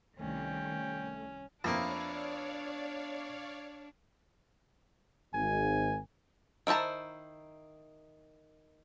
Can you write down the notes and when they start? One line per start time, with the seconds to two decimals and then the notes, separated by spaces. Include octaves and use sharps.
0.20 C2 D#3 A3 C#4 G5
1.64 F2 A#3 B3 D4 E4 C#5 D5 F5
5.34 G#1 G#5
6.67 D#3 E4 C5 A5 A#5